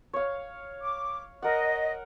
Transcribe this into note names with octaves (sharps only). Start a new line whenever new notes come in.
C#5 F5
D6
A#4 D#5 F#5